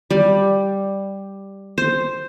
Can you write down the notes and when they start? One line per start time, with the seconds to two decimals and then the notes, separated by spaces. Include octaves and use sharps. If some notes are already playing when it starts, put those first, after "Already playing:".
0.10 G3
1.78 C5